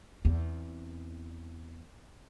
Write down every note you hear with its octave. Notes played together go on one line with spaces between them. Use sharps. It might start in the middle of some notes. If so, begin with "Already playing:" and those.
E2 C4